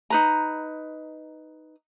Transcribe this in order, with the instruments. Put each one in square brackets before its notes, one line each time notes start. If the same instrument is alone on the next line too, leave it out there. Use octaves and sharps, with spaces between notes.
[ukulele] D#4 B4 A#5